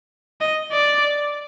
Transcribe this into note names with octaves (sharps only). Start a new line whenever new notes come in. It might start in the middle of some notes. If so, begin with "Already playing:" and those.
D#5
D5